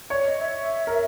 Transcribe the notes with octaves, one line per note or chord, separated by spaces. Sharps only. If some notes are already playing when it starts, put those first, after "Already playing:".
C#5 D5
D#5
E5
A#4